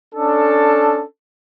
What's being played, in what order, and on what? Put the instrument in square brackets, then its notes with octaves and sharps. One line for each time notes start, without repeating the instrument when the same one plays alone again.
[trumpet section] C#4 D4 A4